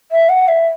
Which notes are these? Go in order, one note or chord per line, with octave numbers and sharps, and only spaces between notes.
E5
F#5
E5